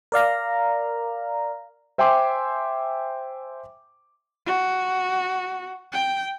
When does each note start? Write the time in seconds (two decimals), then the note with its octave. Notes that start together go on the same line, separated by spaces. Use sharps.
0.12 A#4 D5 F5 A#5
1.98 C5 E5 G5 G#5 C6 D6
4.46 F#4
5.93 G5